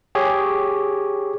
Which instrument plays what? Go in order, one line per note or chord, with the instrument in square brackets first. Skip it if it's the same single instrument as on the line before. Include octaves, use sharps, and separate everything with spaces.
[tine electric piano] G4 G#4 C#5